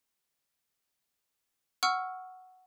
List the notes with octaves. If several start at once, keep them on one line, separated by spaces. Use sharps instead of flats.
F#5 C#6 E6 F6